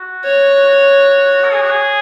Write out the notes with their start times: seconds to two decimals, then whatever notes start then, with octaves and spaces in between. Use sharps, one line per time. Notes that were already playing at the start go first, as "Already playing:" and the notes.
Already playing: F#4
0.24 C#5
0.65 F#4
1.44 A#4
1.53 G#4
1.62 F#4
1.70 G#4